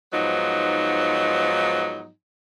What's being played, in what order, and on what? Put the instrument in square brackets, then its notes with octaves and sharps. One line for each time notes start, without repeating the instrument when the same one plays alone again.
[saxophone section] G#2 F3 F#3 B3 D#4